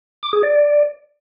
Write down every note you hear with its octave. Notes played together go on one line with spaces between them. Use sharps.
D6
G#4
D5